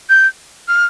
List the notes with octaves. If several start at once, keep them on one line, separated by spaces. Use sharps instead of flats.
G6
F6